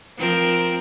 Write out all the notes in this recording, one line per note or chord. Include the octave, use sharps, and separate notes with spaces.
F3 C4 A#4